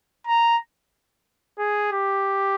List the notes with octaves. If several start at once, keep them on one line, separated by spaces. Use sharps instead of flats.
A#5
G#4
G4